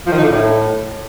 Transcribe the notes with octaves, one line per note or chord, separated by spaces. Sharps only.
F3
D#3
D#4
D3
A2